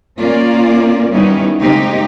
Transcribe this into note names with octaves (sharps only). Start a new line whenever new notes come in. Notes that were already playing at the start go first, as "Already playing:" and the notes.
A#3 C#4 F4 A#4 D5
D#3 G3 B3 C#4 D#4 E4
C#3 G#3 A#3 C4 D#4 G4